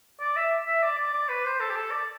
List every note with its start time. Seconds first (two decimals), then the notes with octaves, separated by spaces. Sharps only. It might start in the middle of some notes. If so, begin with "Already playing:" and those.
0.20 D5
0.36 E5
0.67 E5
0.83 D5
0.98 D5
1.14 D5
1.29 B4
1.45 C5
1.60 A4
1.70 G4
1.76 A4
1.91 D5